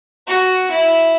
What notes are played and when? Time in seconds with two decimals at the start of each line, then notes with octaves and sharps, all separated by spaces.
0.27 F#4
0.71 E4